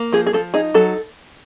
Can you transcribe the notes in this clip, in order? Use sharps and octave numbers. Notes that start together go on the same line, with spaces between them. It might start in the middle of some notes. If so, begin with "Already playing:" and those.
Already playing: A#3
F3 G#4
G#4
F3 A4
D#4 G#4
F#3 A4